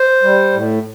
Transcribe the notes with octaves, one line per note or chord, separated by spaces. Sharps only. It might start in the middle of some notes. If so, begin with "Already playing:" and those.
Already playing: C5
G3
A2